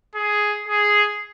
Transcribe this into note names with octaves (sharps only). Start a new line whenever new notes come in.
G#4
G#4